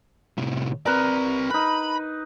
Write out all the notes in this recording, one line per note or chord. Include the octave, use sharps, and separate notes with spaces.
A2 C3
C4 A#4 B4 D5
D#4 B4 B5